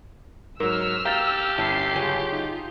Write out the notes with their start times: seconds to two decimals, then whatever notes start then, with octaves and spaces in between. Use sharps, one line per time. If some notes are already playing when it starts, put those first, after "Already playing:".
0.60 G#2 F#3 A#4 E6 F6
1.05 G4 F5 A#5 G6 A6
1.58 G1 C#4 E4 E5 A5 C7
1.95 C#3 F#3 F4 G#4
2.32 D#4